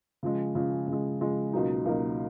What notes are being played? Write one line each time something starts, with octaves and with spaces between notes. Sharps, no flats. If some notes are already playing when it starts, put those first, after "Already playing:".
C#3 F3 G#3
C#3 F3 G#3
C#3 F3 G#3
C#3 F3 G#3
C#2 B2 F#3 A#3 D#4
C#2 B2 F#3 A#3 D#4